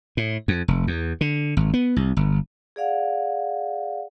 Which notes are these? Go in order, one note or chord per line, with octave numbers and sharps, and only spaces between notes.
A2
F2
F1
E2
D3
G#1
B3
C2
G1
G#4 D5 F5 F#5